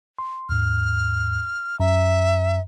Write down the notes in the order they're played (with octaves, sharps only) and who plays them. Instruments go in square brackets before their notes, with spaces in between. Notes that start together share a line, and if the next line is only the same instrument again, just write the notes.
[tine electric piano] C6
[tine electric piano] D#2 G#2 [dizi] F6
[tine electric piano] F#2 A#5 [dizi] E5